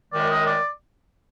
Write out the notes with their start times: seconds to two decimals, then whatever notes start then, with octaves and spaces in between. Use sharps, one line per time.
0.11 F#2 D#3 G#3 D5
0.29 D#5
0.47 D5